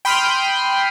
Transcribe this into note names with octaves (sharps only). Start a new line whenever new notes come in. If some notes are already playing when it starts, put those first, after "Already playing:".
G5 B5 C6 D#6 F6 G6